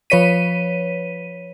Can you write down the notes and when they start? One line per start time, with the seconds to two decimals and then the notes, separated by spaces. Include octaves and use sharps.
0.10 F3 B4 C#5 B6 D#7